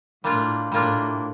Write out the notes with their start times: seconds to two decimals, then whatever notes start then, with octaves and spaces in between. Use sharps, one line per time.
0.24 A2 G3 A#3 D4 F4
0.72 A2 G3 A#3 D4 F4